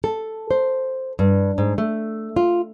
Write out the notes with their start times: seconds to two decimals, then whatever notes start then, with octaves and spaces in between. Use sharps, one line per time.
0.04 A4
0.51 C5
1.19 G2
1.58 G#2
1.78 A3
2.36 F4